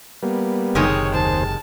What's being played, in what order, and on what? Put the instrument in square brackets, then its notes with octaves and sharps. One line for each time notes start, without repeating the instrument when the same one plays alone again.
[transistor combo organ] G3 A#3 B3
[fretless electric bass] F#1 [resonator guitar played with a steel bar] C3 D#3 G#3 [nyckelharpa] C#5
[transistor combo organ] D#2 G#4 C5 [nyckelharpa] A5